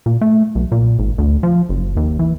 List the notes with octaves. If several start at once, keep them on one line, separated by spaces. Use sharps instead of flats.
A#2
A3
B1
A#2
G#1
D2
F3
F#1
D#2
E3